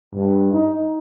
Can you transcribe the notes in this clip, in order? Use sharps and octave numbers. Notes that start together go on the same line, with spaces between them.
G2
D#4